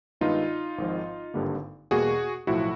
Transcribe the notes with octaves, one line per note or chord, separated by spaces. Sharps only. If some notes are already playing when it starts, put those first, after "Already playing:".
G2 D#3 G#3 B3 D#4 F4
G#1 G#2 F3
G#1 G2 D3 G3 A#3
E2 B2 G3 A#3 F#4 G#4
B1 A2 F3 E4 F#4